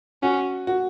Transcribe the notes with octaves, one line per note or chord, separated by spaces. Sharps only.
C#4 F#4
F#4